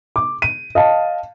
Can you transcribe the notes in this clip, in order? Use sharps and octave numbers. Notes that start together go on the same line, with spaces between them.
D6
D#7
D#5 F5 A5